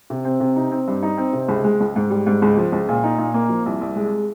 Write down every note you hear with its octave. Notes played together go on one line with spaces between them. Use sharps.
C3
C4
C3
D#4
C4
G2
D#4
C4
C3
C#2
G#3
C#2
G#2
G3
G#2
C#2
F3
C#2
A#2
D#4
A#2
A#3
F3
C2
C2
G#3